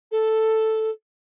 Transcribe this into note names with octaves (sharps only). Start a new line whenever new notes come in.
A4